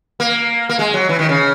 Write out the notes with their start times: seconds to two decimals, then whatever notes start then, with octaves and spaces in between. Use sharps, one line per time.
0.20 A#3
0.69 A#3
0.79 G#3
0.94 F#3
1.09 E3
1.19 D#3
1.29 C#3